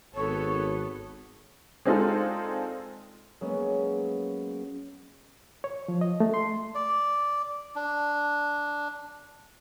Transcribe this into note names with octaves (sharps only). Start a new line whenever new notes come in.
G#1 B3 A4 C#5
G#3 C4 D4 D#4 F4 A4
F#3 G#3 A#3 B3 C#4
C#5
F3
D#5
A3
C6
D5
D4